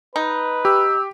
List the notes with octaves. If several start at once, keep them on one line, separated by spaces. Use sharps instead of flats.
D#4 B4
G4 E6